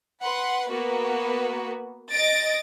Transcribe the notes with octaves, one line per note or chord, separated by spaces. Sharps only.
B4 F#5 C6
A#3 B3 F#4 B4
D#5 A6 A#6 D7